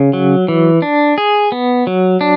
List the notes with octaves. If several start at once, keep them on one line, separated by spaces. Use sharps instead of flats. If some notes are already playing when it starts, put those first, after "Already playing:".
Already playing: C#3
F#3
E3
D4
G#4
B3
F#3
D4